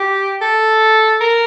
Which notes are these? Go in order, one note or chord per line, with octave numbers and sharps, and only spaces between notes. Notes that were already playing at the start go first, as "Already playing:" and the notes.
Already playing: G4
A4
A#4